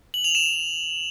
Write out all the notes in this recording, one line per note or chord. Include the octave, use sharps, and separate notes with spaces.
F#7
F7
E7